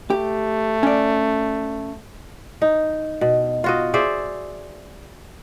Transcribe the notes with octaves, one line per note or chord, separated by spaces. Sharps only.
A3 G4
C#4 D5
D#4
B2
F4 F#4 D#5
G#4 C5 D5 E5